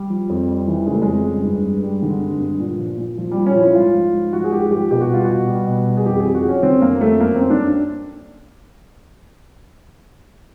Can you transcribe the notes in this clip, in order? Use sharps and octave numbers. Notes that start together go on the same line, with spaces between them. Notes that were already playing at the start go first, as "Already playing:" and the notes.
Already playing: G3
F3
F2
G3
E3
C#3 G#3
A3
F2 G#3
G3
G2
G2
G3
D3
G2
G2
A#2
F3
A#2
F3
G3
A#2
C#4
F3 E4
G#2 F4
F3
G#2
F3 F#4
G#4
G#2 G4
F3 G4
B2 G4
F#4
G3 F4
F#4
B2
G3
B2
G3
G#4
F2 G4
G#4
F2
F#4
F3 C#4
D3 C4
F2 A#3
F2 A3
F#2 A#3
F#2 C4
D4